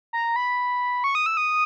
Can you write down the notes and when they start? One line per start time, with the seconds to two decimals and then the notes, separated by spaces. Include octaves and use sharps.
0.13 A#5
0.36 B5
1.04 C#6
1.15 D#6
1.26 E6
1.37 D#6